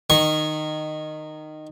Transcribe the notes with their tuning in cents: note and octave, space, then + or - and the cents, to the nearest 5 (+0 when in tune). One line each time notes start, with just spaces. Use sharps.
D#3 -15 C#6 -20